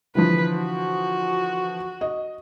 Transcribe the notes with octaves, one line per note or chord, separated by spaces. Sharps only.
D3 E3 F3 B4
F#4
D#5